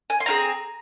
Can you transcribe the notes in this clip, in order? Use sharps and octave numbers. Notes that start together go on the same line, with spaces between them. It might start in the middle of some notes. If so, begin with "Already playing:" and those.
G#5
C6
C4 F4 G#4 A#5